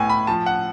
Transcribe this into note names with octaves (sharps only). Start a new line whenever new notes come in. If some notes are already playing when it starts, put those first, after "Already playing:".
Already playing: A2 B3 G#5
B5
F3 A5
F#5